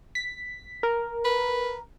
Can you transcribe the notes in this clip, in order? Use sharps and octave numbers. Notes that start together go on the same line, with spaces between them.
B6
A#4
B4